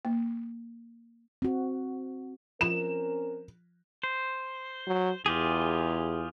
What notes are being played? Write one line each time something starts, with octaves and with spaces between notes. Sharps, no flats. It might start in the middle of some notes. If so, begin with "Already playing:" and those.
A#3
C4 F#4
F3 C4 C#4 F4 A#4 E7
C5
F#3
E2 F4 G4 G#4